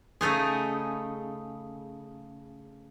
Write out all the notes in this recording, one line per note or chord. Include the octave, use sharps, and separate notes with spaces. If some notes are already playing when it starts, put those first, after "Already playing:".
C#3 A3 D#4 G#4